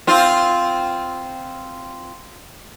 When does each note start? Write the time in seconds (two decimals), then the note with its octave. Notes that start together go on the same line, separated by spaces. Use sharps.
0.07 C4 F4